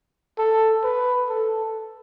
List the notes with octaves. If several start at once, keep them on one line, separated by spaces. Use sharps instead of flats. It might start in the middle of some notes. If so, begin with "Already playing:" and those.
A4
B4
A4